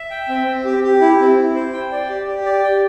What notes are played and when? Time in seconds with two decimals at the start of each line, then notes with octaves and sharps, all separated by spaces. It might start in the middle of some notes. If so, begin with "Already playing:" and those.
Already playing: E5
0.10 G5
0.29 C4
0.47 C4
0.65 G4
0.83 G4
1.01 E4
1.19 C4
1.37 E4
1.55 C5
1.73 G5
1.92 D5
2.09 G4
2.27 G4
2.46 D5
2.63 G5